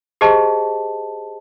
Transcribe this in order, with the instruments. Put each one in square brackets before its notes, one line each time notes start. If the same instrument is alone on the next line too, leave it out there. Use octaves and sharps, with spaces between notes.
[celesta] G4 G#4 C5 D#5 A5